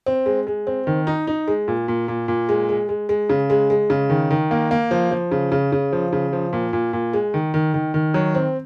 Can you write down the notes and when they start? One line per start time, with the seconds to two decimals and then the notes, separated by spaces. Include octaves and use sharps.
0.06 C4
0.26 G#3
0.47 G#3
0.67 C4
0.87 D#3
1.07 D#4
1.27 D#4
1.48 G#3
1.68 A#2
1.88 A#2
2.08 A#2
2.28 A#2
2.49 G#3
2.69 G#3
2.89 G#3
3.09 G#3
3.29 C#3
3.50 G#3
3.70 G#3
3.90 C#3
4.10 D#3
4.31 D#3
4.51 A#3
4.71 A#3
4.91 F3
5.11 F3
5.31 C#3
5.52 C#3
5.72 C#3
5.93 F3
6.13 C#3
6.33 F3
6.53 A#2
6.73 A#2
6.93 A#2
7.13 G#3
7.34 D#3
7.54 D#3
7.74 D#3
7.94 D#3
8.14 F#3
8.35 C4